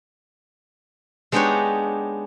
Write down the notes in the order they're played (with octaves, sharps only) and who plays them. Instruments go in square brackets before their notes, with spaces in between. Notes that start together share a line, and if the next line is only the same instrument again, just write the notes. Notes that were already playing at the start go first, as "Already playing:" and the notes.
[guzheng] G#3 B3 D4 D#4 G4 C#5